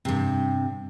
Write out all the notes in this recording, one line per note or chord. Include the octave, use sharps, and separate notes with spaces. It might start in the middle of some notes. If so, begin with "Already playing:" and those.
G2 C3